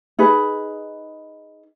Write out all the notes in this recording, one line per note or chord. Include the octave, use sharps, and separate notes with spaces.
D#4 G#4 B4